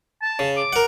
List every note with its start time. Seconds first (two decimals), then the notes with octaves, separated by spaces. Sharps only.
0.22 A5
0.39 C#3
0.56 D6
0.73 A#4 F#5